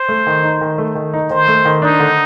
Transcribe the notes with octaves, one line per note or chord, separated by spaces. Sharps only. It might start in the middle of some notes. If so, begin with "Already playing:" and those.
Already playing: C5
A3
D#3
D#4
D#3
A3
D#3
D#4
D#3 C5
A3
D#3
D4 D#4
D3